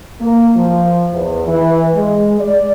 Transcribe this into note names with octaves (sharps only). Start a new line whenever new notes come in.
A#3
F3
E2
E3
G#3
D5